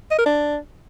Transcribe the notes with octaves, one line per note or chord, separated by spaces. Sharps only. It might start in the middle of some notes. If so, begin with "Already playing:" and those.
D#5
A#4
D4